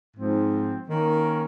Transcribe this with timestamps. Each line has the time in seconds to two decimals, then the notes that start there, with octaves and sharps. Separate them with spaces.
0.17 G#2 F3 C4
0.88 D#3 A#3 C#4